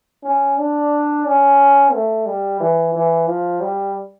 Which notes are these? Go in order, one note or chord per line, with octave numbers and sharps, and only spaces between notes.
C#4
D4
C#4
A3
G3
E3
E3
F3
G3